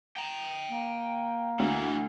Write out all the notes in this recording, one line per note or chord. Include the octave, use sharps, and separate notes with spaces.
G5 A#5
A#3
D2 E3 F#3